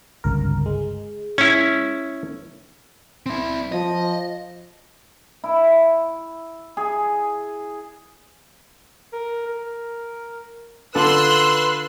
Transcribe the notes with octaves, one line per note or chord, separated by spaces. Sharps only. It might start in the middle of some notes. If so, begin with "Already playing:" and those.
G1 C#2 A#4
G#3
C#4 E4
C4 E4
F3 D#5
E4
G#4
A#4
A#4
D3 F4 A4 B4 C6 E6 F#6